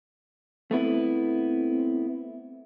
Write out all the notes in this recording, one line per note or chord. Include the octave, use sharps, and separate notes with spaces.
A3 B3 C4 E4